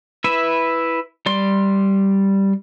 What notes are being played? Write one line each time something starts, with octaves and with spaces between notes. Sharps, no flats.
E4 B4 E5
G3 D5 C6